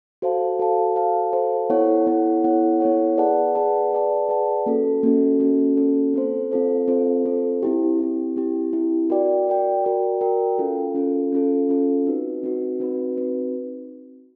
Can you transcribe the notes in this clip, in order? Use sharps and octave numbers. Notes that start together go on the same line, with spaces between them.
F#4 A4 C5 F5 A5
F#4 A4 C5 F5 A5
F#4 A4 C5 F5 A5
F#4 A4 C5 F5 A5
B3 E4 A4 C#5 F#5
B3 E4 A4 C#5 F#5
B3 E4 A4 C#5 F#5
B3 E4 A4 C#5 F#5
G#4 B4 D5 F#5 A5
G#4 B4 D5 F#5 A5
G#4 B4 D5 F#5 A5
G#4 B4 D5 F#5 A5
A#3 C#4 F#4 A4
A#3 C#4 F#4 A4
A#3 C#4 F#4 A4
A#3 C#4 F#4 A4
C4 F4 A4 C5
C4 F4 A4 C5
C4 F4 A4 C5
C4 F4 A4 C5
C4 E4 G4
C4 E4 G4
C4 E4 G4
C4 E4 G4
F#4 A#4 D5 G5
F#4 A#4 D5 G5
F#4 A#4 D5 G5
F#4 A#4 D5 G5
C#4 F4 A4
C#4 F4 A4
C#4 F4 A4
C#4 F4 A4
C4 D#4 F#4 B4
C4 D#4 F#4 B4
C4 D#4 F#4 B4
C4 D#4 F#4 B4